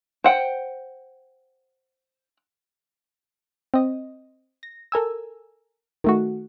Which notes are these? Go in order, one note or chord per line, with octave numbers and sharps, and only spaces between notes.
C5 F#5 G5
C4 D#5
A#6
A4 A#4 G#5 E6
D#3 A3 F#4